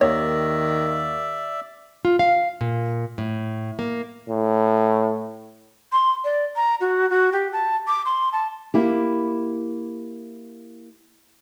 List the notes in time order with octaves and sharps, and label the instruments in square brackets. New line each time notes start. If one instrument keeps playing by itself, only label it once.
[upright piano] D#2 [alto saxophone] D#3 [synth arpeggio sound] C#5 [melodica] D5 E5
[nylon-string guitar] F4
F5
A#2
A2
A#3
[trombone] A2
[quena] C6
D5
A#5
F#4
F#4
G4
A5
D6
C6
A5
[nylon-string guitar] A#3 E4 G4